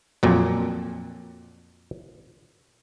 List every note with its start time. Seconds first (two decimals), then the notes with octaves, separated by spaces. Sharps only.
0.23 F2 A#2 F#3